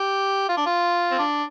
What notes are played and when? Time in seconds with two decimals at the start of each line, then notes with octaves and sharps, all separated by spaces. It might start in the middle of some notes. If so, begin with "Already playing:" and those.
Already playing: G4
0.49 F4
0.57 D4
0.66 F4
1.12 C4
1.19 D4